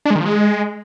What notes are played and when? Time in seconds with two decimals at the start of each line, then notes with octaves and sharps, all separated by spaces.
0.05 D4
0.10 G#3
0.15 D#3
0.20 F3
0.25 G#3